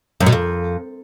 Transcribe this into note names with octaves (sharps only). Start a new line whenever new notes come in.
F#2
B2
F2